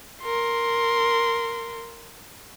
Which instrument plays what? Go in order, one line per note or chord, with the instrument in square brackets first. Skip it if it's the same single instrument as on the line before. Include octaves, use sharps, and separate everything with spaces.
[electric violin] A#4 C6